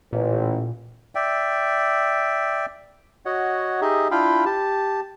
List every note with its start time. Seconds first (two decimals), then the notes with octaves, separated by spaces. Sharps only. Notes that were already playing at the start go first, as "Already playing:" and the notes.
0.13 A1 A#2
1.15 D5 E5 G5
3.25 F#4 C#5 D#5 F#5
3.81 D#4 G4 G#4 D#5 E5
4.11 D4 E4 F4 F5 G5 B5
4.46 G4 A5